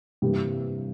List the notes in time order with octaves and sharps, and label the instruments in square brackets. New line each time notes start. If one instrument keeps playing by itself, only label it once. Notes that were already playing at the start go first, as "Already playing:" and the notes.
[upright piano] G2 E3 A#3 E4 G4 [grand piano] C3